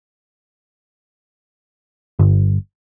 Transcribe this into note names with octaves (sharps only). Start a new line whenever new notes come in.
G1